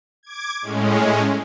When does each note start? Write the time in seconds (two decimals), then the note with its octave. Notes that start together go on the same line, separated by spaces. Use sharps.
0.23 D6 G#6
0.62 A2 G#3 C#4